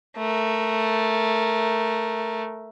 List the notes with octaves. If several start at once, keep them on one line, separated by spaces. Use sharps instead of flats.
A3 A#4